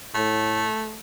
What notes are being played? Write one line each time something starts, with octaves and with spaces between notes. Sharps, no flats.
A2 A3